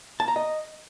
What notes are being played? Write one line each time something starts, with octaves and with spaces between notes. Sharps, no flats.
A5
A#5
D#5